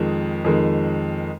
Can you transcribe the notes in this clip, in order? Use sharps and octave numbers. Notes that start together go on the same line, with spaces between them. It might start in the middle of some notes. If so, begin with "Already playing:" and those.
Already playing: F2 D#3 G#3
F2 D#3 G#3